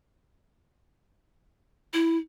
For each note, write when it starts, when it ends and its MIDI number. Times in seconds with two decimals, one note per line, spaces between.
1.94 2.17 64